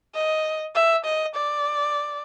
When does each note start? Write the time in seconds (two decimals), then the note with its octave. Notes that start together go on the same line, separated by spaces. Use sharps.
0.15 D#5
0.75 E5
1.05 D#5
1.35 D5